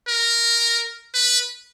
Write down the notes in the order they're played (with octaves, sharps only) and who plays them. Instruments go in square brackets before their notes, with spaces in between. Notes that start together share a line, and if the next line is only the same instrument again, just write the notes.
[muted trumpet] A#4
B4